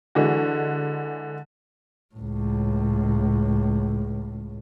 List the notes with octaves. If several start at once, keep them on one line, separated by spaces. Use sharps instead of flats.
D3 E3 G#3 F#4
C#2 A2